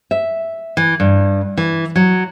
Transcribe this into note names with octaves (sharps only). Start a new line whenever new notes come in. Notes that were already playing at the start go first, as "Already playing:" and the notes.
E5
E3
G2
E3
F#3